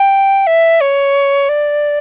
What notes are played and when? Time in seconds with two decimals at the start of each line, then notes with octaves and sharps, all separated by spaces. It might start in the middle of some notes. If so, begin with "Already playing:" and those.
Already playing: G5
0.47 E5
0.81 C#5
1.49 D5